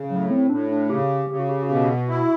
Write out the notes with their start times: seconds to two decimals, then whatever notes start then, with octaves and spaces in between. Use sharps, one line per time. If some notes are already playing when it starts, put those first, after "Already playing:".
Already playing: C#3
0.10 A2 F#3
0.31 C4
0.50 A2 D4
0.70 D4
0.90 C#3 G4
1.29 C#3 G4
1.39 F#4
1.49 G4
1.63 F#4
1.69 B2 G4
1.90 F#4
2.09 E4 F#4